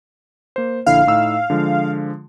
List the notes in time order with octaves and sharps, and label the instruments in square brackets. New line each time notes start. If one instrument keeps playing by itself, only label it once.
[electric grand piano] A#3 C5
[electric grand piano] A#1 D3 E4 [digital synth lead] F5
[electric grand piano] A2 D#4 E6
D3 F3 G#3